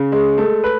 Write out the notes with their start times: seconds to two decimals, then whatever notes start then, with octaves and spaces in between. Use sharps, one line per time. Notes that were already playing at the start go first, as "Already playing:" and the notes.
Already playing: C#3
0.12 G#3
0.38 A3
0.64 B4